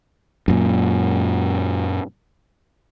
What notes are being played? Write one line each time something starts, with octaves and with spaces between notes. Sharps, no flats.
F#2 A#2